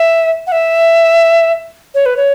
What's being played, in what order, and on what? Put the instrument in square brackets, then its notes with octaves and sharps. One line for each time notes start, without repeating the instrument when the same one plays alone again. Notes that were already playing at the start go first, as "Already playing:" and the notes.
Already playing: [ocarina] E5
F#5
E5
C#5
B4
C#5